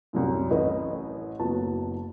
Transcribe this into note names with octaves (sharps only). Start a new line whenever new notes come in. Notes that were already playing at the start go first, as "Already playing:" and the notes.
C2 F#2 A2
A1 A2 B4 D#5
F#1 F#3 B3 A5